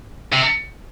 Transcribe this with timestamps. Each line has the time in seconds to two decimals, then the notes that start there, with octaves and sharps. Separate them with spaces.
0.33 C3